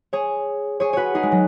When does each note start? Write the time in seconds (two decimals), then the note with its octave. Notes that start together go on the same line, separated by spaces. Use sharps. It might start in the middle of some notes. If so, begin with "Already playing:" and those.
0.13 G#4 C#5
0.80 G#4 C#5
0.93 F#4 B4 C#5
1.15 D#4 G#4
1.23 G#3
1.32 F#3